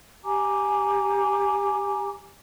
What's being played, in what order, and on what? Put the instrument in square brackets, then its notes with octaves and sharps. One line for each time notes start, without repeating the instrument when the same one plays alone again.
[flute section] G4 G#5 A#5 D6